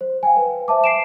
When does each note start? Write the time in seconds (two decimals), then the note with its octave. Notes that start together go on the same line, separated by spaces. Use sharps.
0.01 C5
0.23 F5 G5 G#5
0.37 B4
0.68 C5 E5 A5 D6
0.84 C7 D7 E7